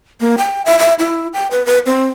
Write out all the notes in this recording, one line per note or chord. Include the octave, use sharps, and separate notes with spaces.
A#3
G5
E5
E5
E4
G5
B4
B4
C4